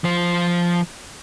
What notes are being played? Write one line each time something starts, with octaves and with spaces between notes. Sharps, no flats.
F3 C5